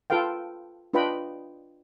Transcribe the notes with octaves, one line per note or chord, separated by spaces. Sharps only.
F4 A4 B4 F5 G5
D4 F4 B4 D#5 G5 B5